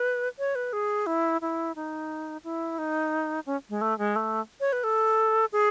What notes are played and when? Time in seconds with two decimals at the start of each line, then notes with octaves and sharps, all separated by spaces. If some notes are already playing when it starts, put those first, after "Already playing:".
Already playing: B4
0.39 C#5
0.55 B4
0.73 G#4
1.06 E4
1.41 E4
1.76 D#4
2.44 E4
2.78 D#4
3.46 C#4
3.69 G#3
3.81 A3
3.98 G#3
4.16 A3
4.60 C#5
4.72 B4
4.84 A4
5.52 G#4